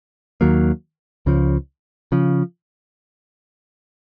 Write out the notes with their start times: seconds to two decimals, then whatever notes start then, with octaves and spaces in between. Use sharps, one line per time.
0.41 D#2 D#3 F#3 A#3
1.26 C#2 C#3 F3
2.12 C#3 F3